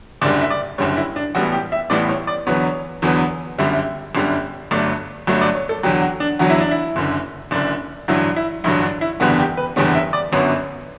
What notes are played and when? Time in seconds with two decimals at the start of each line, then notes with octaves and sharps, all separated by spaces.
0.21 F#1 F#2 D3 G3 D5
0.41 E5
0.50 D5
0.78 F#1 F#2 D3 G3 C#5
0.97 E4
1.16 D4
1.35 A1 A2 G3 B3 F#4
1.52 G4
1.72 E5
1.90 A1 A2 G3 B3 D5
2.09 C#5
2.27 D5
2.47 E2 D3 F#3 B3 C#5
3.02 E2 D3 F#3 B3
3.58 G1 F#2 D3 G3 E5
4.15 G1 F#2 D3 G3
4.71 G1 G2 F#3 A3 D5
5.27 G1 G2 F#3 A3
5.41 D5
5.55 C#5
5.69 A4
5.83 E2 D3 F#3 G4
6.02 F#4
6.20 D4
6.39 E2 D3 F#3 F#4
6.50 E4
6.60 D4
6.71 E4
6.96 F#1 F#2 D3
7.51 F#1 F#2 D3 D4
8.08 A1 G2 D3 F#3 E4
8.36 E4
8.64 A1 G2 D3 F#3 E4
8.83 D4
9.01 E4
9.20 F#1 E2 D3 G3 B3 F#4
9.39 G4
9.57 B4
9.76 F#1 E2 D3 G3 B3 C#5
9.95 E5
10.13 D5
10.32 G1 F#2 D3 F#3 B3 C#5